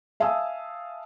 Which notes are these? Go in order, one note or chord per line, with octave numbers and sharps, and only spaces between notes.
E5 F5 G#5 A5 D#6 E6